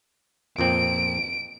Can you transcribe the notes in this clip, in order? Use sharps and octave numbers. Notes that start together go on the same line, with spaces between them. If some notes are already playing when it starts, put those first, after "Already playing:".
F2 A#2 C4 D7